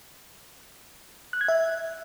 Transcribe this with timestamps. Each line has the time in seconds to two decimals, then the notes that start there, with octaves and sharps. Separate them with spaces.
1.33 F#6
1.41 G#6
1.48 E5